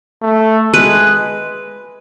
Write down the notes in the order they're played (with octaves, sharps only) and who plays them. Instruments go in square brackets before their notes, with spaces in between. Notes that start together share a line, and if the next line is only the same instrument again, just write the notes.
[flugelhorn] A3
[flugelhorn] G#3 [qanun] B4